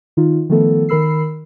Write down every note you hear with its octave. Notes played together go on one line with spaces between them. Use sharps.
D#3 D#4 F4
D#3 F3 A3 B3 A4
D#3 A#4 B5 E6 C7